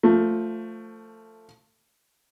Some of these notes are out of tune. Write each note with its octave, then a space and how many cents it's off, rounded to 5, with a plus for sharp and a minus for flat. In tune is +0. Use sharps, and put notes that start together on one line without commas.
F3 +10 A3 +20